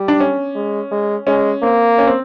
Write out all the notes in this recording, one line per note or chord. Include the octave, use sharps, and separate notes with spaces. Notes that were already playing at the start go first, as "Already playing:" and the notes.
Already playing: G3
D4
C#4
G#3
G#3
G#3 C#4
A#3 C4
C#4
C4